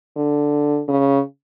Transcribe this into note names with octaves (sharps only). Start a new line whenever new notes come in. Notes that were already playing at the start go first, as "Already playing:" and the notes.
D3
C#3